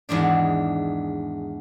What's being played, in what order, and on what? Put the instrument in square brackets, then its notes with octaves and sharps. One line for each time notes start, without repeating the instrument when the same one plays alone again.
[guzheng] E2 G#2 D#3 D4